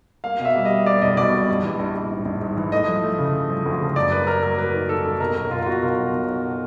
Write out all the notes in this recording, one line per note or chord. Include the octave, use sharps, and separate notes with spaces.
A#3 F5
B2
E5
G3
D#5
G3
A#3 D5
B1 D#5
B2 D5
G3
A#1
E3
A#1
A#1
G#2
A#1
G#2
E3
A3 D#5
F3
A3
C#3
C#3
F3
D2
C#3
F#2 D5
A#3 B4
A#3 A#4
F#3 A#4
F#3 B4
D#3
D#3 A4
F#2
B2 A#4
B1 A#4
B1 F4
F4
B2 F#4
B2 A#4
B1
B1
B1